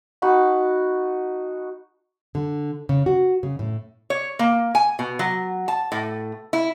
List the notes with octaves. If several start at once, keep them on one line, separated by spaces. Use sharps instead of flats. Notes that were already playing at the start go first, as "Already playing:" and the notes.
D#4 F#4 A5 B5
D3
C#3
F#4
C#3
A2
C#5
A#3
G#5
B2
F#3
A5
A2
E4